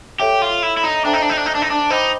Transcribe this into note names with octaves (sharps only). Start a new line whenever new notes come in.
G4 A4 C#5 E5
F4
E4
E4
D#4
D4 A4 C5 E5 G5 A#5
D#4
D4
D#4
D4
D#4
D4
D#4
D4
D#4 C5 D#5 G5 B5 D6